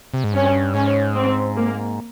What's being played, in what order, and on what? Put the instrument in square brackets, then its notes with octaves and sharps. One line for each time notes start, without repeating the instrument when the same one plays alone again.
[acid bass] C3
G#2
[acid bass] G2 [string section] C#4
[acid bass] G#2 [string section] C#4
[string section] C4
A#3